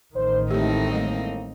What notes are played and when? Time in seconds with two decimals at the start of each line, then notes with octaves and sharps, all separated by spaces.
0.15 A1 D#3 C5
0.51 A2 G#3 A3 C4 D#4 G4 E5
0.92 A2 G3 A3 A#3 D#5